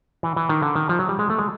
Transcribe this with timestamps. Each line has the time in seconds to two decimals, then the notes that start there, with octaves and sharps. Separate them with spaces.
0.23 E3
0.36 E3
0.49 D#3
0.63 D3
0.75 D#3
0.89 F3
0.99 F#3
1.09 G3
1.19 G#3
1.30 A3
1.39 G#3